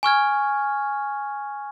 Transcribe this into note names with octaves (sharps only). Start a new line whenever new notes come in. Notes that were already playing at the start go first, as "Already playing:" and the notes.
G#5 C#6 F6 G#6